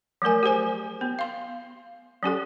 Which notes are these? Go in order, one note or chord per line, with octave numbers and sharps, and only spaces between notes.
F3 F#3 A3 A#4 G#5
G4 G#4 C5 G#5
B3
F5 C6
F#3 C#4 G4 A4